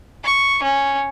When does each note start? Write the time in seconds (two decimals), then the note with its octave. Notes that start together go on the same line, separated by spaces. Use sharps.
0.24 C#6
0.63 C#4